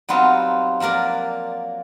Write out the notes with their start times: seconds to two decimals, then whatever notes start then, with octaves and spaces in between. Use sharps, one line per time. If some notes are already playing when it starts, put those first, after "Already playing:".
0.09 F#3 G3 B3 C4 D#4 F4
0.80 F3 F#3 A#3 A#4 D5